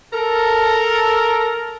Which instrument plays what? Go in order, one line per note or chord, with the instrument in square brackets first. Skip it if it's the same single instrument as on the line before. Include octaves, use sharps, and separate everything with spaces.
[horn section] A4 A#4